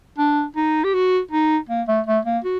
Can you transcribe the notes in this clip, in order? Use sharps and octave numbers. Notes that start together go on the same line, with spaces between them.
D4
D#4
G4
F#4
D#4
A#3
A3
A3
A#3
F#4